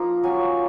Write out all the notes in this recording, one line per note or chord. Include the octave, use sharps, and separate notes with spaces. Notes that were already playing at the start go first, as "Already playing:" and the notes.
Already playing: F3 A#3 D#4 F4 A#5
F#3 C#4 F4 G#5